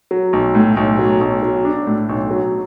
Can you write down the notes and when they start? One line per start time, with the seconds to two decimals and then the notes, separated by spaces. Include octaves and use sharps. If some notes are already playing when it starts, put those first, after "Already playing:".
0.11 F#3
0.33 B1
0.55 A2
0.77 B1
0.99 F#3
1.21 B1
1.43 F#3
1.65 D4
1.87 A2
2.09 B1
2.31 F#3